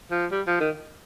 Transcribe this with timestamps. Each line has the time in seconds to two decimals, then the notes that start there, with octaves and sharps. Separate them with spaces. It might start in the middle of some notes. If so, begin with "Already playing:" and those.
0.11 F3
0.32 G3
0.47 F3
0.61 D#3